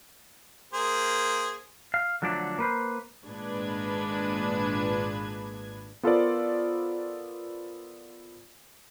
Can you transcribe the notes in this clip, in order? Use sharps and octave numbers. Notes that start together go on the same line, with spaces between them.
A#3 G#4 C5
F5
D3 F3 F#3 A3 D4
A#3 B4 C5
G#1 A#2 G#3 D4 B4 G#6
B3 F4 A4 A#4 C5 D5